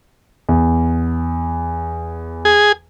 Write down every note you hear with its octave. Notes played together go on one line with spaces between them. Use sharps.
E2
G#4